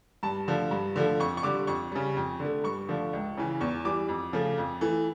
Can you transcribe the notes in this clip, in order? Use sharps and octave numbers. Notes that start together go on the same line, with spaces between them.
G2 A5
D3 F3 A3
G2
D3 F3 A3
F2 C#6
C#6
D3 G3 D6
F2 C#6
C#3 G3
F2
D3
A3
G2 C#6
D3 F3 A3
C#2
C#3 E3
E2 C#6
E3 G3 D6
F2
C#3 F3 A3
F2
E3 A3